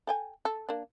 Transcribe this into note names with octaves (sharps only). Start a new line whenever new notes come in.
A4 G5 G#5
A4
A#3 D4